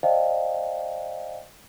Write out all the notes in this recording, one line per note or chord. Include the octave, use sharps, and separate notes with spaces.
C5 D5 D#5 F5 G5 A5